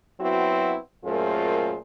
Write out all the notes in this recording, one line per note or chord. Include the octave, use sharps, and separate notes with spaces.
F#3 B3 C4 E4 F#4
F#2 A#2 A3 F4 G#4 C5